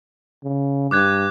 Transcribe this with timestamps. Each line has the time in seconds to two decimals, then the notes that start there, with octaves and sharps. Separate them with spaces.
0.43 C#3
0.91 G2 D6 F#6 G#6